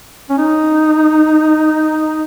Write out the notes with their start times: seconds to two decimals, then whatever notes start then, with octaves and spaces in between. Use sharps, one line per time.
0.30 C#4
0.38 D#4